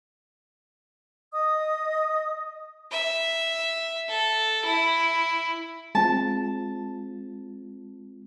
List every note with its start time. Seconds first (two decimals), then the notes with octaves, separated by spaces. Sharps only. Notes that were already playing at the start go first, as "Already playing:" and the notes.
1.32 D#5 D#6
2.92 E5
4.09 A4
4.65 E4
5.95 G#3 C4 F4 A5